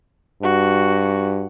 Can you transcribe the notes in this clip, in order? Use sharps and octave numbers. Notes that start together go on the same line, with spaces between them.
G2 F#4